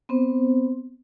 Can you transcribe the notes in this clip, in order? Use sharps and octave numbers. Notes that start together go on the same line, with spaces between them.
B3 C4 C5